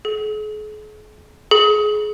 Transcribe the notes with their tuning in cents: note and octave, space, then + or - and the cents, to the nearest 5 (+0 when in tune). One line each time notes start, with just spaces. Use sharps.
G#4 +40
G#4 +25